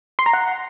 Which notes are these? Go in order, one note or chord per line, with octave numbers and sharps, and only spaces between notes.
C6
A#5
F#5